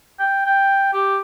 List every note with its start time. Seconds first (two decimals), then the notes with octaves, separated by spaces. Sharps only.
0.19 G5
0.46 G5
0.93 G4